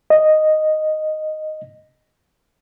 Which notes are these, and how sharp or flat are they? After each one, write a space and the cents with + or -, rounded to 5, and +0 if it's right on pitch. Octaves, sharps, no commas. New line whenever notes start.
D#5 -5